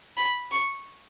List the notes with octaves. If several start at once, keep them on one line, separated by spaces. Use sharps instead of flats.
B5
C#6